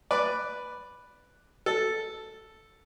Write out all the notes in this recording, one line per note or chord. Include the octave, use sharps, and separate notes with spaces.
B4 D5
A4